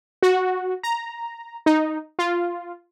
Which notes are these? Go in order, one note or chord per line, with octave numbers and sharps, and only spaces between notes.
F#4
A#5
D#4
F4